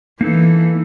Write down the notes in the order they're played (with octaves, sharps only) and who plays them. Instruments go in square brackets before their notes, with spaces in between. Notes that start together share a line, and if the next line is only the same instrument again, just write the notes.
[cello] E3 [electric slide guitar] A#3 D#4 A4